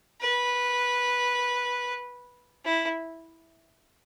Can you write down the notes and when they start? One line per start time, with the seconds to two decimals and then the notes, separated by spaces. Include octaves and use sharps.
0.21 B4
2.65 E4